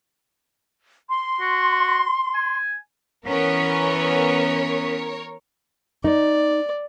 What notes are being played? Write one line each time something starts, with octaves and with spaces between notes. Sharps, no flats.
C6
F#4
G#5
E3 B3 C#4 A#4 C#5
D#4 D5